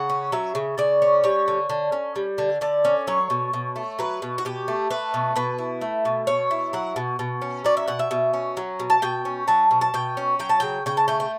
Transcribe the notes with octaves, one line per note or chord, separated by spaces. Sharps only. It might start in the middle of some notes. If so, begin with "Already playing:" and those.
Already playing: C#3 F#5
C#4
F#3 E5
C#3
C#3 D5
C#4
G3 C#5
D3
D3
C#4
G3
D3
D3 D5
C#4
F#3 C#5
B2
B2
A3
F#3 B4
B2
F#4
B2 G4
A3
A3 B4
B2
B2 B4
E4
A3
B2
B2 C#5
E4
F#3 F#5
B2
B2
C#4
F#3 D5
E5
B2 F#5
E5
B2
C#4
F#3
B2
A5
B2 G5
C#4
F#3 A5
B2
A5
B2 G5
C#4
F#3 G5
A5
C#3 G5
C#3 G5
A5
A3 G5
G5